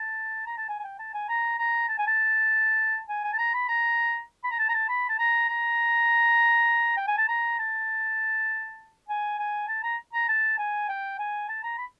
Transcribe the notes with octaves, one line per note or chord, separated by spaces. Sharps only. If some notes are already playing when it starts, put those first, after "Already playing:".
Already playing: A5
A#5
A5
G#5
G#5
G5
A5
G#5
A#5
A#5
A5
G#5
A5
G#5
G#5
A5
A#5
B5
A#5
B5
A#5
A5
A#5
A5
B5
A5
A#5
A#5
G5
G#5
A5
A#5
A5
G#5
G#5
A5
A#5
A#5
A5
G#5
G5
G#5
A5
A#5
B5